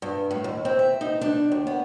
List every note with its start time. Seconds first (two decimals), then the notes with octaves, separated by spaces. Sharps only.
0.02 G2
0.31 A2
0.44 D#2
0.65 C4
0.79 E5
1.01 D#4
1.21 D4
1.52 D#2
1.67 B3